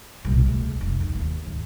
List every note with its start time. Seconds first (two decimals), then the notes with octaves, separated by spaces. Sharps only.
0.25 C2 A#2
0.46 C#2 A3
0.81 F1
1.01 D#3
1.15 D#2
1.46 G#2